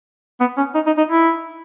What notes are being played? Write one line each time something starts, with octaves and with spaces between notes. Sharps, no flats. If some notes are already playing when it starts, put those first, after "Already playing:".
B3
C#4
D#4
D#4
D#4
E4